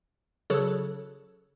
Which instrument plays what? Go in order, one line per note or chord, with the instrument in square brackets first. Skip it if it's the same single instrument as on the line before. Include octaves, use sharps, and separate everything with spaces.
[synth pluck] C#3 F#3 A4